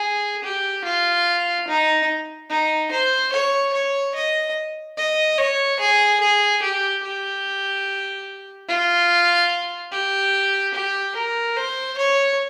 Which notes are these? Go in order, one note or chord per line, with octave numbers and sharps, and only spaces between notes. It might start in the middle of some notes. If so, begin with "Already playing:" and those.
Already playing: G#4
G4
F4
D#4
D#4
C5
C#5
C#5
D#5
D#5
C#5
G#4
G#4
G4
G4
F4
G4
G4
A#4
C5
C#5